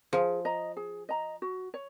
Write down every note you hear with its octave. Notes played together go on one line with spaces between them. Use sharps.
F3 G#4
D#5 A#5
G#4
D#5 A#5
F#4
C#5